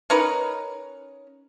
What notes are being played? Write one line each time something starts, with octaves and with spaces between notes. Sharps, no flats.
C#4 D#4 A#4 B4